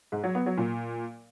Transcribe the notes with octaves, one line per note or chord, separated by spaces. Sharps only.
G#2
F#3
B3
F#3
A#2